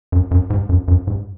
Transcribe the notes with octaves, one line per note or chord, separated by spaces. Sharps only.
F#2
F#2
G#2
F#2
F#2
G#2